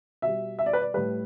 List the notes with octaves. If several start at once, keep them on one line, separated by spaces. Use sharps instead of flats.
B2 G3 E5
E5
D5
B4
D5
A2 G3 B4